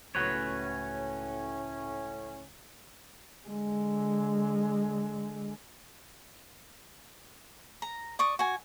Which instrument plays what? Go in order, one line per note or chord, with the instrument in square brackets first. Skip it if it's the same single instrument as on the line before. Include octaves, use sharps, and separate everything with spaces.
[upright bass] C#2 [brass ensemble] A2 C#4 [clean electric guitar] F#4 B4 C#5
[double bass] D3 G#3
[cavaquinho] A#5
D5 C#6 D#6
F#4 G#5